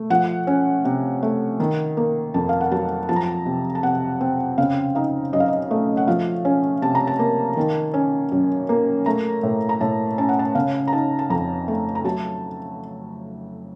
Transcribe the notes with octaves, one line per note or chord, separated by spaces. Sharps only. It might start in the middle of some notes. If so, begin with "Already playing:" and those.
Already playing: A3
F3 F#5
C#4
C3
A3
D#3
A#3
F2 A5
F5
F#5
F#3 A5
F3 A5
A#5
A5
C3
A5
C3 F#5
C4
C#3 F5
D#4 F5
F#2 D#5
F5
D#5
A3
F#5
F3 F5
C#4
C3 A5
A#5
A5
A#3
D#3
C#4
F#2
A#3
A3 A#5
A2
A#5
A2 A5
C#4 A5
F#5
A5
C#3 F5
A#5
D#4 A5
A5
F2 A#5
A3
A#5
F#3 A5